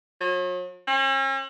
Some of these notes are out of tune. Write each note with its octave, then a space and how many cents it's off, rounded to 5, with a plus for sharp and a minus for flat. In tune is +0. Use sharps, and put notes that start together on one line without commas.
F#3 -40
C#4 -45